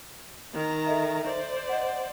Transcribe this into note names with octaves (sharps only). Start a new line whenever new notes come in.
D#3 A#5
A4 D#5 E5
C5 D5
D#5 F#5